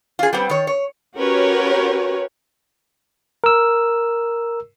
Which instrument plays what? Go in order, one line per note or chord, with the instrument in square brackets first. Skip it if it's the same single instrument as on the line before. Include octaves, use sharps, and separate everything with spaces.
[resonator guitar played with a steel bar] F4 G#4
G3 B3 C4
D#3 C#5
C#5
[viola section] C#4 F#4 G4 A#4 B4 C#5
[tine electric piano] A#4 E6